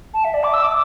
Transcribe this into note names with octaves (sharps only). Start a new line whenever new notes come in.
A5
E5
D5
D6
E6
D6